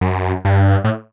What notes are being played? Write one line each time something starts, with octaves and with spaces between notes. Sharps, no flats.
F#2
G2
A2